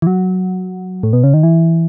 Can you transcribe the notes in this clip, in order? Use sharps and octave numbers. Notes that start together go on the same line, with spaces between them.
E3
F#3
A2
B2
C#3
D#3
E3